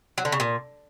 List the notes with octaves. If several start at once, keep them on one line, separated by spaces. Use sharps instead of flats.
F#3
D3
C#3
A#2